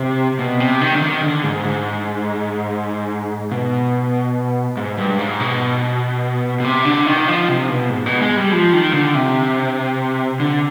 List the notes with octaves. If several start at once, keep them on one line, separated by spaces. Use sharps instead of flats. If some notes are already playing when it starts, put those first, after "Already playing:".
Already playing: C3
B2
C3
D#3
D3
D#3
D3
G#2
G#2
B2
G#2
G2
G#2
B2
B2
C3
D3
D#3
F3
C3
B2
G#2
B2
G#3
G3
F3
D#3
D3
C3
D3